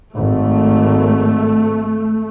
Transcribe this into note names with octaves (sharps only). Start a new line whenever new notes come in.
G#1 A3